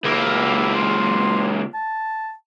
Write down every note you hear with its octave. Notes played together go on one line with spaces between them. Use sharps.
C#2 A#3 E4
C6
A5